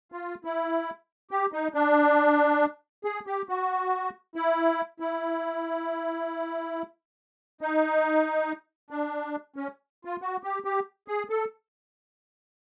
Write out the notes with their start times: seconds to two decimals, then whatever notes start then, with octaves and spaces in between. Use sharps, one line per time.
0.12 F4
0.45 E4
1.31 G4
1.53 D#4
1.74 D4
3.05 G#4
3.27 G4
3.49 F#4
4.36 E4
5.00 E4
7.61 D#4
8.90 D4
9.56 C#4
10.05 F4
10.21 F#4
10.43 G4
10.64 G4
11.08 G#4
11.30 A4